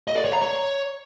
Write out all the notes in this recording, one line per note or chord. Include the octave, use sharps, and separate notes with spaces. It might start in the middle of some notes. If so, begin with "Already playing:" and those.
D#5
D5
C#5
A#5
C#5